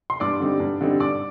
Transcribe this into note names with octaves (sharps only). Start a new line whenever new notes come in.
C6
G2 D5 D6
D3 G3 C4 D#4
G2
D3 G3 C4 D#4
G2 D5 D6